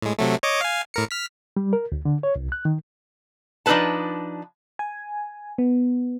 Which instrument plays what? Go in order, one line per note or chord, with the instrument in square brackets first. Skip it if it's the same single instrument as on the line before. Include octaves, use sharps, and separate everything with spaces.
[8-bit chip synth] A2 G#3
C3 F#3 A3
C#5 D#5 D6
F5 G#5
A2 A#4 C#7
F6 B6
[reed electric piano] G3
A#4
D2
D3
C#5
C2
F#6
D#3
[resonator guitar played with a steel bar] F3 D4 D#4 A4 B4 A5
[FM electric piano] G#5
B3